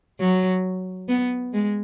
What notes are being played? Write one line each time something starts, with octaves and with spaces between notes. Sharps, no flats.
F#3
B3
G#3